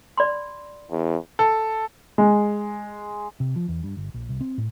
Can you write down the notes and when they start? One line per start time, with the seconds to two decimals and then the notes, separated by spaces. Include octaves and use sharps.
0.18 D5 B5 C6
0.90 E2
1.39 A4
2.18 G#3
3.40 C3
3.56 F3
3.68 E2
3.83 G2
3.97 G1
4.14 A#1
4.29 C2
4.41 C4
4.58 A2